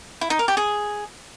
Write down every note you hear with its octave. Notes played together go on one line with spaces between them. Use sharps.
E4
D#4
A#4
G4
G#4